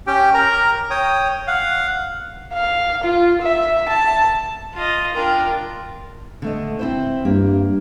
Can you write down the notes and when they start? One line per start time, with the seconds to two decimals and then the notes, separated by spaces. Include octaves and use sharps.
0.07 C#4 G4 G5
0.34 A#4 A#5
0.90 C#5 G5 D#6
1.47 F5 F#5
2.53 F5
3.04 F4
3.42 E5
3.89 A5
4.74 F4 D#5
5.14 D4 F4 A#4 G5
6.42 D3 A3 D#5
6.79 C4 E4 C5
7.25 G2 A#3